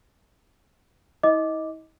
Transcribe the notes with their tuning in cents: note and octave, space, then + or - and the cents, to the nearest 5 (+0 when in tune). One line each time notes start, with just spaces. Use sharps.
E4 -45 D#5 +15 D6 +0